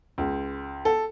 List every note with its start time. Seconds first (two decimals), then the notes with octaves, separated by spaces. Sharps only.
0.18 C#2
0.85 A4